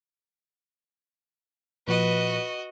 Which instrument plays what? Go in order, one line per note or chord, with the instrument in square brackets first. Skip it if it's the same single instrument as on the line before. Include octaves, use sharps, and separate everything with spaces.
[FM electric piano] A#2 F3 [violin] F#4 D#5 [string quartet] B4